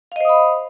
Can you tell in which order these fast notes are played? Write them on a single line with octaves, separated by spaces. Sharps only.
F5 D#5 C5 D#6 B5